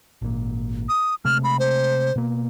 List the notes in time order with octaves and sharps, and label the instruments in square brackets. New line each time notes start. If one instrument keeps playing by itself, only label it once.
[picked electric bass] G#1 A#2
[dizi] D#6
[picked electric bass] C3 G#3 A3 [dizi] F6
[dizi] B5
C5
[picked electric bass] B2 A#3